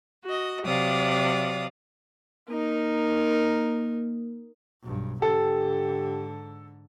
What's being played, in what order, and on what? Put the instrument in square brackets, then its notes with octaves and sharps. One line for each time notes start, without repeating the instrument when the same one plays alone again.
[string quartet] F#4 D#5
C3 F#3 D5 F5 D#6
[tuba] A#3 [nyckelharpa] D#4 A#4
[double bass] B1 G2
[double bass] G#2 D3 [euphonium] G4 [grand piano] A4